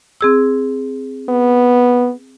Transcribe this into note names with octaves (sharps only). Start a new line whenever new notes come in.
C4 G#4 E6
B3